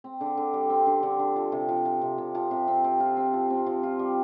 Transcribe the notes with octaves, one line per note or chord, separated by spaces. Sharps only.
C4
D3
D3
G3
C4
D3
D3
D3
F3
C3
F3
F3
C3
C3
F3
C3
C4
C4
F4
C4
F3
C4
F3
F4
G3